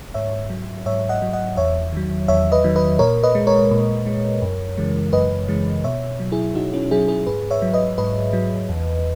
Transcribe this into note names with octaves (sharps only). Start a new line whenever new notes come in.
G#2 C#5 E5
F#3
G#2 C#5 E5
D#5 F#5
F#3
D#5 F#5
E2 C#5 E5
D#3 F#3
E2 C#5 E5
B4 D#5
D#3 F#3
B4 D#5
A#2 A#4 C#5
B4 D#5
G#3
A#4 C#5
A#2
G#3
F#2
C#3 E3 G#3
F#2 B4 D#5
C#3 E3 G#3
B2 C#5 E5
F#3
E4 G#4
B2 D#4 F#4
C#4 E4
F#3 E4 G#4
E4 G#4
G#2 G#4 B4
C#5 E5
F#3
B4 D#5
G#2 B4 D#5
F#3
E2